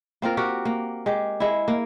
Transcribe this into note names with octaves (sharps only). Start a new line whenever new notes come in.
A#3 C4 F4 A#4
F#4 G4 A#4
A#3
G#3 G4
G#3 E4
A#3